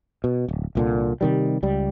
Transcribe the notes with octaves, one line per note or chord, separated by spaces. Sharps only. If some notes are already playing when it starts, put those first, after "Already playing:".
B2
D1
C2 A#2 D3
C3 D#3 G3
C#2 G3